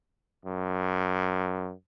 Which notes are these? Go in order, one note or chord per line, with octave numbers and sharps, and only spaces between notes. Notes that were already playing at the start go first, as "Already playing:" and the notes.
F#2